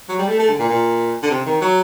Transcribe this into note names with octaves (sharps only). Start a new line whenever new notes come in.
F#3
G3
A3
A3
D3
A#2
A#2
D3
C3
D#3
F#3